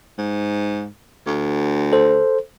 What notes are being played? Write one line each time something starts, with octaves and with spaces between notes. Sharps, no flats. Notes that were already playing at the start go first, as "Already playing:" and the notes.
G#2
D2
A4 C5